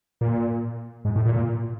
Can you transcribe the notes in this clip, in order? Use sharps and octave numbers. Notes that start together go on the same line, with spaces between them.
A#2
G#2
A2
A#2
A#2